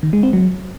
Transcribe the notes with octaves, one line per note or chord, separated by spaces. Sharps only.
D#3
G#3
C4
F#3